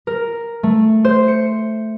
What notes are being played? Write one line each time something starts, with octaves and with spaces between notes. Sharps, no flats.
A#4
A3
C5
C#7